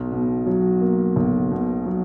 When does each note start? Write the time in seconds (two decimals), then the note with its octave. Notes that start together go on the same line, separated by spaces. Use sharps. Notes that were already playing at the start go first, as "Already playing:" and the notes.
Already playing: B1
0.12 B2
0.46 F#3
0.81 A#3
1.16 B1
1.51 B2
1.86 F#3